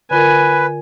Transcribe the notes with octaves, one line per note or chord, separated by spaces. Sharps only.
D3 F4 A#4 B4 G#5